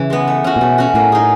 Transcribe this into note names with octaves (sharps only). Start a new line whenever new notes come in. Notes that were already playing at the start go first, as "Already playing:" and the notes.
Already playing: C#3 E3
G#3 B3
A3
C#4 F#4
A#2
B2 A3
C#4 F#4
A2 A#3
D#4 G#4